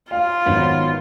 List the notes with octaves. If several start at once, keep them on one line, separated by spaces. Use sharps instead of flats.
F4 F5
G#1 D#3 F#3 B3